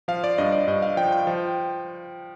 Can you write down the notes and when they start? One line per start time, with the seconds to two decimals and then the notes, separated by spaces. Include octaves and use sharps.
0.08 F3 F5
0.24 D5
0.38 G2 D#5
0.52 D5
0.67 G2 D#5
0.82 F5
0.97 F3 G5
1.12 G5
1.27 F3